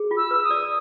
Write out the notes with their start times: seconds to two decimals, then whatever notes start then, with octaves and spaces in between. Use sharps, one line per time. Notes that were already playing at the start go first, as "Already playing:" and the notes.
Already playing: G#4
0.11 F4
0.17 E6
0.31 B4
0.44 D#6
0.51 D5